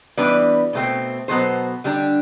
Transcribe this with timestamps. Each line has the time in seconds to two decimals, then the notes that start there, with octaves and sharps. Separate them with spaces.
0.17 E3 G3 B3 D4 B4 D5
0.73 B2 A3 C4
1.28 B2 F#3 B3 A4 C5
1.84 D3 G3 D4